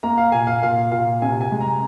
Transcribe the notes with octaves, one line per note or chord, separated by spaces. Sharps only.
A#3 A#5
F5
A#2 G#5
F5
A#2 F5
A#2 F5
C3 G#5
G#5
G#3
A#5